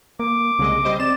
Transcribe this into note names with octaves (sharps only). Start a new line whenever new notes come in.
A#3 D6
C2 C#3 G#3 D#5
G3 C5 D#5
C4 D5 E7